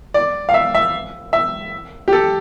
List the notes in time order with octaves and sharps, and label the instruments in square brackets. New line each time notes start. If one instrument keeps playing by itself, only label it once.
[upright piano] D5
F5
E5
E5
E5
G4
A4